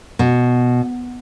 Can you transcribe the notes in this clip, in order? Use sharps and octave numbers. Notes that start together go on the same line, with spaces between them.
B2